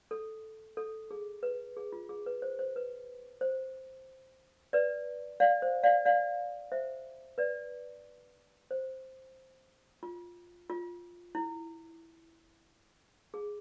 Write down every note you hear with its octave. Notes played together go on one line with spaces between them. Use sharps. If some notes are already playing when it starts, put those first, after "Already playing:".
A4
A4
G#4
B4
G#4
F4
G#4
B4
C5
C5
B4
C5
B4 D5
D5 F5
C5
D5 F5
D5 F5
C5 E5
B4 D5
C5
F4
F4
E4
G#4